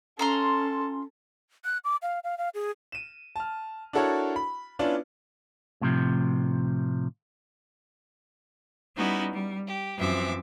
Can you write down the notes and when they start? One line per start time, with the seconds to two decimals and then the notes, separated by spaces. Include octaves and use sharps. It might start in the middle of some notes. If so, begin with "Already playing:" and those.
0.19 C#4 F4 A4 A#5 C6
1.65 F#6
1.84 D6
2.02 F5
2.24 F5
2.38 F5
2.54 G#4
2.92 D#7 E7
3.36 A5 F6
3.93 D4 E4 F#4 A4 A#4 C#5
4.36 B5
4.79 B3 C#4 D4 E4 F4 D5
5.81 A2 C3 F3
8.96 G3 B3 C#4 D#4 E4 F#4
9.33 G3
9.67 G4
9.96 F#2 E3 F3 C4 E5 D6